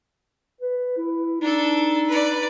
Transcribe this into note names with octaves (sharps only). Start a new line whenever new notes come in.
B4
E4
D4 D#4 A4
B4 D5